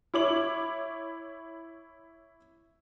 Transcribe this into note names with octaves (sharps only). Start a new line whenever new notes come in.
E4 C#5 D6 F#7